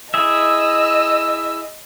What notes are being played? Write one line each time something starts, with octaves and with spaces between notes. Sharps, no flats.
E4 G#4 D#5 E5 E6